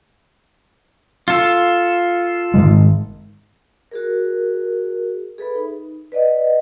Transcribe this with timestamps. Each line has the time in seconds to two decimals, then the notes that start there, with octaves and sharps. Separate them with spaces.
1.28 F4 A4
2.54 G#2 D#3 G#3
3.91 F#4 G#4 A#4
5.38 G#4 A4 B4 E5 B5
5.55 D#4
6.12 B4 D5 D#5 F#5